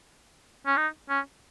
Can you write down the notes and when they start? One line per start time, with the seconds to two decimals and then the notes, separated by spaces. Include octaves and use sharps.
0.67 C#4
0.77 D#4
1.10 C#4